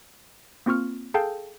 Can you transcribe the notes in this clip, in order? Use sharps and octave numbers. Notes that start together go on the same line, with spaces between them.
A#3 C4 F4 C#6 F6
G#4 A4 F5 G5 A5 G6